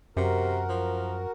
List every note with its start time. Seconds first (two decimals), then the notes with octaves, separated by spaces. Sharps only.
0.17 F#2 C3 F#4 A#4
0.69 F3